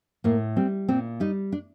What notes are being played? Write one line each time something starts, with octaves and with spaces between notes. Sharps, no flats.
A2 A#3
G3 C4
A#2 C4
G3 D#4
D4